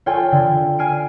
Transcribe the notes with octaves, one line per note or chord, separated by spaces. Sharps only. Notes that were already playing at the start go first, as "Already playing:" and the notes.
F4 A4 C#5 G5 G#5
D3
G#5 F6 C7 D7 D#7